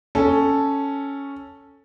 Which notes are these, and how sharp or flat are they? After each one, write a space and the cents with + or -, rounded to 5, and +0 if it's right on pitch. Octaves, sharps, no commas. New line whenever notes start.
C#4 +0 A4 +0